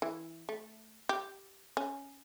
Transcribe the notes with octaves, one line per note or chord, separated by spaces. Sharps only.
E3
A3
G4
C#4